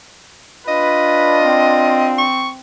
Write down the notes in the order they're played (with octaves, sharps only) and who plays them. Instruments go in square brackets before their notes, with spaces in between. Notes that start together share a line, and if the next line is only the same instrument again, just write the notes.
[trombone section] D4 F4 [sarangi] B4 [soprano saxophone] D#5
[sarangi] C4
[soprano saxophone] C#6